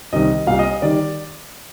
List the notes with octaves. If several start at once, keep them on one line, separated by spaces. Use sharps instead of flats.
C2 C3 D#3 G3 D#5
C2 A#2 G3 F5
D#5
D#5
D#3 G3 D5